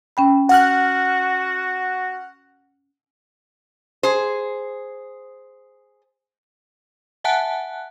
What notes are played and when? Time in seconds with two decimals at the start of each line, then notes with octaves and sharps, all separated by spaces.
0.17 C#4 G5 B5
0.49 F#4 F#5 F6 F#6
4.03 G#4 C5
7.24 E5 F#5 G#5 A5 F#6